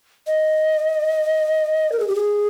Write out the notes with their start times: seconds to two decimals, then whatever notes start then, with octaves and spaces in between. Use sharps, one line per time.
0.27 D#5
1.92 A#4
2.00 G#4
2.08 G4
2.15 G#4